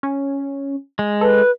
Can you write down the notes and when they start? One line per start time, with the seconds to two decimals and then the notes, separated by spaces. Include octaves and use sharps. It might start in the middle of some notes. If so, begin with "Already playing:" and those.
0.03 C#4
0.99 G#3
1.21 A4 B4